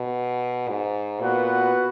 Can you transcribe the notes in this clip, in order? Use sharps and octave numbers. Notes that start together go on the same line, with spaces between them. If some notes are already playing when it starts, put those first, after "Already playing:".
Already playing: B2
G#2
A#2 B3 F#4 B4 F#5